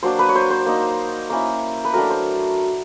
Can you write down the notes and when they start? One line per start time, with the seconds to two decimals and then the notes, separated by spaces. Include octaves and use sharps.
0.03 F#3 A#3 D4 C5
0.19 B4
0.29 C#5
0.35 C5
0.50 C5
0.66 A#3 D#4
1.30 A#3 C#4 E4
1.85 B4
1.94 F#3 A3 D4 A#4
2.10 C5